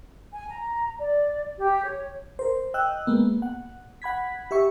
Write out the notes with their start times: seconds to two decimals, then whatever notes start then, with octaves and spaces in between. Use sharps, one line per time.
0.34 G#5
0.49 A#5
0.99 D5
1.57 G4
1.83 C#5
2.39 A#4 C5
2.74 D#5 G5 E6 F#6
3.07 G#3 A#3 B3
3.42 F#5
4.02 F#5 B5 G#6 B6
4.51 G4 E5 C#6